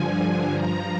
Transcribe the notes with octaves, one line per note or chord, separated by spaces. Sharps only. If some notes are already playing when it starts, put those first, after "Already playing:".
Already playing: G2 D3 F3 G#5
G2 F3 A#5